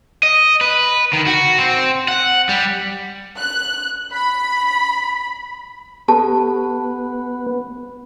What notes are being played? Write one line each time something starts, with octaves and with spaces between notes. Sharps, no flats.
D#5
B4
D#3
F#4
C4
F#5
G3
F#6
B5
B3 G4 A4 A5